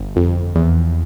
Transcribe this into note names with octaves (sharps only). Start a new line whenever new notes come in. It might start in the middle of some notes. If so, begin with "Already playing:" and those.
Already playing: G1
F2
E2